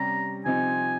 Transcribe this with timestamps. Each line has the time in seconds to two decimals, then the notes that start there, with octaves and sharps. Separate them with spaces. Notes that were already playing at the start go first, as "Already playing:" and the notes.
Already playing: C3 G3 C#4 A#5
0.45 C3 F3 C4 D#4 G#5